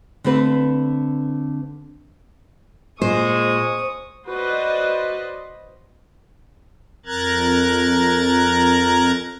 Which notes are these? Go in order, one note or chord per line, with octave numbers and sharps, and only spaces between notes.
D3 A3 C4 B4
A#2 G#3 C5 C#6 D#6
F#4 B4 C5 D5 D#5
F2 A#4 A#5 F#6 G#6 A6